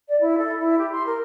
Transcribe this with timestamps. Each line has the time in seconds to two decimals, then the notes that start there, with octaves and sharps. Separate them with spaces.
0.08 D5
0.21 E4
0.38 A4
0.60 E4
0.78 G4
0.92 C6
1.06 A#4